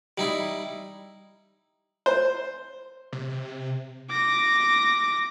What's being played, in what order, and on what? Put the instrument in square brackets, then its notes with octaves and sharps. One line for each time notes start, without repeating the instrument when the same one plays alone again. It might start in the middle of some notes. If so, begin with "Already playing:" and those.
[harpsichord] G3 D#4 E4
[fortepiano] C5
[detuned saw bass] C3
[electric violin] D6 A#6